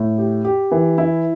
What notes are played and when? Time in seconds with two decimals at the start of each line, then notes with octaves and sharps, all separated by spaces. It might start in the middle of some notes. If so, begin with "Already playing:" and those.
Already playing: A2
0.18 G4
0.45 G4
0.72 E3
0.98 E4